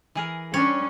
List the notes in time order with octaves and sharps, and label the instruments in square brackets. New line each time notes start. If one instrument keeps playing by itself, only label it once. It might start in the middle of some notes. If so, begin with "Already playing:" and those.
[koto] E3 G#4 A#4
[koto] G3 D4 [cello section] C#4 [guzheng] C#5